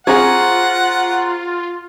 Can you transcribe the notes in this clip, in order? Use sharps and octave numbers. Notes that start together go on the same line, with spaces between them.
C4 F4 G#4 F#5 A#5 C#6 G#6